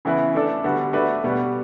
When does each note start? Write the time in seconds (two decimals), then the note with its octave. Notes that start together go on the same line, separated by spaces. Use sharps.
0.05 C#3 E3 B3 E4 B4
0.34 A3 D4 A4
0.64 D3 G3 B3 F#4
0.93 A3 D4 F#4 B4
1.24 B2 G3 B3